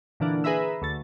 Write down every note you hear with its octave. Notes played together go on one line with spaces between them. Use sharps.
A#2 D3 E3 A#3 D4
G#4 B4 E5 A#5 B5 E6
D2 A3 A6